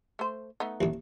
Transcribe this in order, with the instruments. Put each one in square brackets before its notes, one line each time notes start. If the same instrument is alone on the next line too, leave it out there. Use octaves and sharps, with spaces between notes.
[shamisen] A3 C5
A3 B3 D#4
[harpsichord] A1 D#2